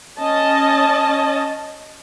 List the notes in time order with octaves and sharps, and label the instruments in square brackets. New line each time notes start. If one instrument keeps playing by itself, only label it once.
[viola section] C#4 D#5 A5